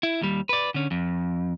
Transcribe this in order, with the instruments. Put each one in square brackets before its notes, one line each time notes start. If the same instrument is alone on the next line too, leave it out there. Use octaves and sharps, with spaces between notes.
[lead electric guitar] E4
D#2 G3
B4 D5
D3 C#4
F2